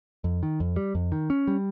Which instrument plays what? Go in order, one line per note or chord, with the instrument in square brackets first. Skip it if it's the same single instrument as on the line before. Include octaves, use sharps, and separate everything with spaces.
[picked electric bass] F2
D#3
F2
G3
F2
D#3
C#4
G3